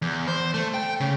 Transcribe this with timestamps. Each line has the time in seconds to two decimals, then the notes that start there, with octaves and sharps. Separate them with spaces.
0.02 E2
0.28 C5
0.54 A3
0.74 G5
1.00 C#3